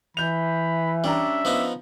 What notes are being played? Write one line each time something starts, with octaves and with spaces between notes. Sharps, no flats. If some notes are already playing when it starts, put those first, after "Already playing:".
E3 B5 G6 F7
G3 C#4 D4 E5 A#5
F3 B3 D#4